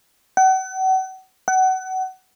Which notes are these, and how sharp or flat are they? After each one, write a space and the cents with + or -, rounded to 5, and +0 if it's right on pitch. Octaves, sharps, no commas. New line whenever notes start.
F#5 +35
F#5 +25